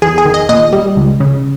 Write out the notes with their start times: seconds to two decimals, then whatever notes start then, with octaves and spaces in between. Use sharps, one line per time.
0.02 E2 G#4
0.18 G#4
0.25 D#3
0.34 D#5
0.49 A#2 D#5
0.73 G3
0.97 C#2
1.20 C#3